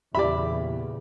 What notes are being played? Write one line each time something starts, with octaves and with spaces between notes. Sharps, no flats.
E2 A#2 C#3 G4 D5 E5 B5